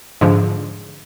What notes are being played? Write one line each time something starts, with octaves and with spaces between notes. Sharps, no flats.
G#2 D3 F3